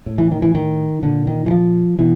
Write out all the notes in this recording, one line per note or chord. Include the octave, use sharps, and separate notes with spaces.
A2
E3
D#3
E3
D#3
A#2 D3
D#3
E3
F3
B2 E3